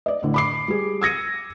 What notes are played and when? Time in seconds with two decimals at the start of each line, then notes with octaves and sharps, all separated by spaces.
0.06 D5 D#5
0.23 A2 D3
0.34 B5 D6 C7
0.68 G3 G#4
1.01 E6 G#6 A#6 C#7 D#7